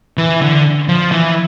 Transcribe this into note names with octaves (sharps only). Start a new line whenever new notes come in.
E3
D3
F3
E3